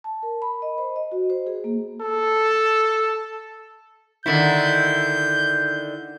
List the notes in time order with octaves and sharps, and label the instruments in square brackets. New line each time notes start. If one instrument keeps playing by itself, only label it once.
[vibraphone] A5
A#4
B5
D#5
C5
D#5
F#4
C5
G#4
A#3
[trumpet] A4
[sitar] D3 D#3 E4 [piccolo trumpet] G6